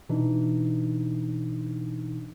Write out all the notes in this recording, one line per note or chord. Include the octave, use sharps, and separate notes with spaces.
B2 E3 D4 D#4